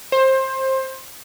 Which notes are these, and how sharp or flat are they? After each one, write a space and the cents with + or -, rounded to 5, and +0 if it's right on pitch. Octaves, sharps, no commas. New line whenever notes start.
C5 +20